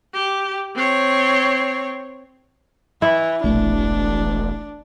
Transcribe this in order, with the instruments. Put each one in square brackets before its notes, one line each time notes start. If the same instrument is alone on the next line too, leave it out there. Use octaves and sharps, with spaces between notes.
[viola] G4
C4 C#5
[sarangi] E3 [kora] E4
[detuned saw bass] E1 [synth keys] A#1 A3 [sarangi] D4